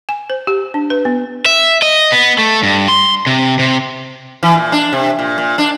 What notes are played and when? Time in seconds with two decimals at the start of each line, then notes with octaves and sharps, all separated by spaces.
0.09 G#5
0.30 C5
0.47 G4
0.74 D4
0.90 B4
1.05 B3
1.46 E5
1.82 D#5
2.12 B3
2.38 A3
2.63 G2
2.88 C6
3.27 C3
3.59 C3
4.43 E3
4.55 A#2
4.72 D4
4.93 C3
5.19 A#2
5.38 A#2
5.58 D4